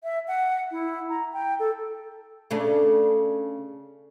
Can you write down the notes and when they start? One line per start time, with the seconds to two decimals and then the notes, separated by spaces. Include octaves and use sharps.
0.04 E5
0.28 F#5
0.71 E4
1.09 A#5
1.33 G5
1.60 A4
2.51 C#3 A3 D4